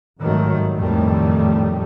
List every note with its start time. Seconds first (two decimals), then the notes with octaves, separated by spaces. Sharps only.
0.20 G#1 D#3 F#3 G3 A3
0.74 B1 F2 A2 D#3 G3 A3